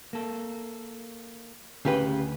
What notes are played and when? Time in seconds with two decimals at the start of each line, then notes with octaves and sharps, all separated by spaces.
0.13 A#3 A4
1.85 D2 C#3 G4 B4 G5